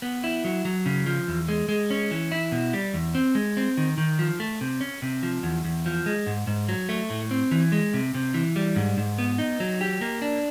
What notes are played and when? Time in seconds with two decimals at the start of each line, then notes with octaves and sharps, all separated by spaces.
0.02 B3
0.24 E4
0.45 F#3
0.65 F#3
0.86 C#3
1.06 F3
1.28 E2
1.49 G#3
1.69 G#3
1.90 C#4
2.11 E3
2.32 E4
2.52 B2
2.73 G3
2.94 E2
3.15 C4
3.35 G#3
3.57 C4
3.77 D#3
3.98 D#3
4.19 F3
4.40 A3
4.61 C3
4.81 C#4
5.02 C3
5.23 F3
5.43 E2
5.65 E2
5.86 F3
6.06 G#3
6.27 G#2
6.47 G#2
6.68 F#3
6.89 A3
7.10 A2
7.31 C4
7.51 E3
7.72 G#3
7.94 C3
8.15 C3
8.34 E3
8.56 G3
8.76 G#2
8.97 G#2
9.19 B3
9.38 D#4
9.60 F#3
9.81 G4
10.01 A#3
10.22 D4